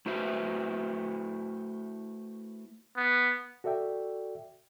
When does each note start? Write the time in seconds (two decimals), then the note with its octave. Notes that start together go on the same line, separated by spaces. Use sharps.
0.06 A3 E4 F#4 B4 C5 E5
2.97 B3
3.64 F#4 A4 D5 E5 G5